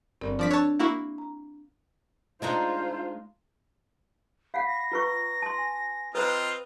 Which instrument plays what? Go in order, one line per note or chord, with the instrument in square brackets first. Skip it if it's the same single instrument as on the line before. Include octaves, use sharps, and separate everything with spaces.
[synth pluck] G1 [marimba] C4 A#4 D5
[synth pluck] F3 D5 B6 [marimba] D4
[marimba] D4 E6 F#6 [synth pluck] C#5 A5
[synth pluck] A#3 E4 F#4
[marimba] A#5
[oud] G#3 D4 D#4 [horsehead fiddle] F4 C5
[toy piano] F5 F#5 [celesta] B5 C7
[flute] A#6
[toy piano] F4 B4 C#6 [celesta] A#5
[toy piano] A5 C6
[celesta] G#5
[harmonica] C4 F4 D#5 [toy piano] B4 C5 B5 [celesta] A#5 F#6